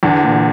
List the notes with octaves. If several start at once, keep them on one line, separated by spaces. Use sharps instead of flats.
E2 D3
A#2